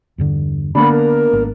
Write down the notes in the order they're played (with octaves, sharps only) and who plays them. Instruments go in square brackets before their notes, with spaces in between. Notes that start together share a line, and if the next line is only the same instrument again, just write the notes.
[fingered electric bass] E2 G2 D3
[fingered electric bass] D3 [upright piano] A#3 B3 D4 [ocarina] B5
[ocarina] A#4
[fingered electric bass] G#1